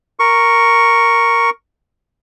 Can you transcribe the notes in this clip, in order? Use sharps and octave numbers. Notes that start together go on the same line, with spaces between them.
A#4 C#6